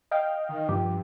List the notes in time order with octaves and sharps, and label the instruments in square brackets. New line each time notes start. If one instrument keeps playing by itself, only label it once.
[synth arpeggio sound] D#5 F5 G5
[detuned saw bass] D#3
[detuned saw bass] G2 [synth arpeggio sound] F3 G4